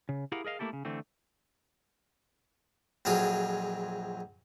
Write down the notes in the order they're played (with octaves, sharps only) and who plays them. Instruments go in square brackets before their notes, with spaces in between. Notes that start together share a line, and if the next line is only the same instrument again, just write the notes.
[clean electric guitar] C#3
E4 G4 G#4 A#4 F5 F#5
G#4 A#4 D#5 F5
A3 A#3 E4 G4 A4
C#3
D3 E3 A3 C4
[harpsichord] A#1 F2 F#3 F4 G#4